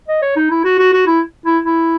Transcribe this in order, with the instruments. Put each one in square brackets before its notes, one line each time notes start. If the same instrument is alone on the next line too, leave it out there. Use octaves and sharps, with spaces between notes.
[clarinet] D#5
C#5
D#4
E4
F#4
F#4
F#4
E4
E4
E4